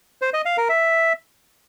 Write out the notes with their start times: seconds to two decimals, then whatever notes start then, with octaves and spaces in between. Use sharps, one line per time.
0.22 C5
0.34 D#5
0.45 F5
0.57 A#4
0.69 E5